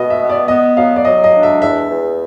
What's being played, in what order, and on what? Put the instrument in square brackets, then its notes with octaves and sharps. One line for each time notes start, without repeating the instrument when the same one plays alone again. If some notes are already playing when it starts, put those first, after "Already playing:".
Already playing: [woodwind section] B2 [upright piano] D#5
[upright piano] E5
[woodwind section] B3
[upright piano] D5
[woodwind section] B3 [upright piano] D#5
[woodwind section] F#3 [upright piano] F5
[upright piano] D5
[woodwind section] F#3 [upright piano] D#5
[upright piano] D#5
[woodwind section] D4
[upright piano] E5
[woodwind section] E2 [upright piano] E5
[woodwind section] E2